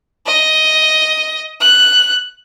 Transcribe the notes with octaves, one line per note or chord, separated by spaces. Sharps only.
D#5
F#6